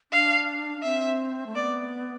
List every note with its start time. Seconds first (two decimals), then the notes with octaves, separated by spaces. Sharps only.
0.12 D4 F5
0.83 C4 E5
1.46 A3
1.55 B3 D5